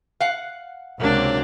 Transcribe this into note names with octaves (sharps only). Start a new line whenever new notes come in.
F5 F#5
C#2 C3 F#3 A#3 D4